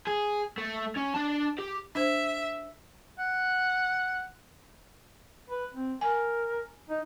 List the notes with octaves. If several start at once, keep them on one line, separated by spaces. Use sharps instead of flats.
G#4
A3
C#4
D4 A5
G4
D4 C5 E5
F#5
B4
C4
A#4 G#5
D#4